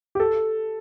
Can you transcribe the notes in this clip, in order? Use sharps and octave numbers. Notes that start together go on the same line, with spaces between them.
G4
A4